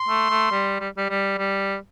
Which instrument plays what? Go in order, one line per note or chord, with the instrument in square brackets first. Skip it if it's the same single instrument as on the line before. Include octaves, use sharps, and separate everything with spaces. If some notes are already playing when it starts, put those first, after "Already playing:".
Already playing: [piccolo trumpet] C6
[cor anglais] A3
A3
G3
G3
G3
G3
G3